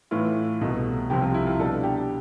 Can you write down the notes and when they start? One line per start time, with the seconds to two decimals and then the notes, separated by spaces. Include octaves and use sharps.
0.11 A2 E3 A3 E4 F4
0.61 C2 B2 A3
1.10 C2 C3 F3 C4 G4
1.22 F4
1.34 E4
1.47 F4
1.59 B2 G3 D4 A4
1.84 G4